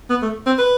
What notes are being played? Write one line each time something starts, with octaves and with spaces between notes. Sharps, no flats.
B3
A3
C4
B4